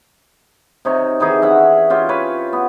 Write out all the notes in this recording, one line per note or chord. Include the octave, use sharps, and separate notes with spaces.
C3 D#4 C#5
D#3 E3 D#4 G#4
C#4 E5 F#5
C#4 F4 G4
C#4 B4 C#5
B3